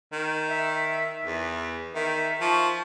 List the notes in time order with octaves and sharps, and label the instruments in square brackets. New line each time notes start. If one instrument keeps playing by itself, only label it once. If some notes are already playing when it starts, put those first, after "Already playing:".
[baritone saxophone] D#3
[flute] E5
[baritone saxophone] E2
[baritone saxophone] D#3 [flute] E5
[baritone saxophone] F3 [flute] C#6